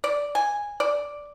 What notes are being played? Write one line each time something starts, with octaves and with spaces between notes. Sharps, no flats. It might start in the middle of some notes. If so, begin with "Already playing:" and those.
D5
G#5
D5